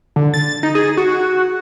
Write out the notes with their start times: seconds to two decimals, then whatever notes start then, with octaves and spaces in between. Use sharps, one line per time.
0.16 D3
0.34 A6
0.63 D#4
0.75 G#4
0.97 F#4